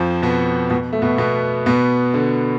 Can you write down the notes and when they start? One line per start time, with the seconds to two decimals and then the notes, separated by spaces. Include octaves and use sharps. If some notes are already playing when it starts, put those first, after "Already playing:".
Already playing: F2 F3
0.22 B2 B3
0.70 B2 B3
0.93 A3
1.02 B2 B3
1.18 B2 B3
1.66 B2 B3
2.14 D3